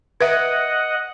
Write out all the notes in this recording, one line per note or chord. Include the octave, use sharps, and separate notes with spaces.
B4 D#5 E5 F#5